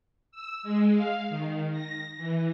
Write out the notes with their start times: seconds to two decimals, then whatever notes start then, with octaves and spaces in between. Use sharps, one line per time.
0.32 E6
0.63 G#3
0.95 F5
1.30 D#3
1.72 A#6
2.17 E3